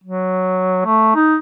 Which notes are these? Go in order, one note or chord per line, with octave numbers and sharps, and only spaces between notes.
F#3
A3
D#4